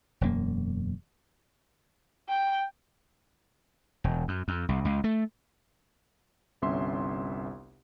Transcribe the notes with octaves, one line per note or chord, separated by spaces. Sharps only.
E1 F#2 A#3
G5
E1
F#2
F2
C2
C#2
A3
G1 C2 C#4 E5 C6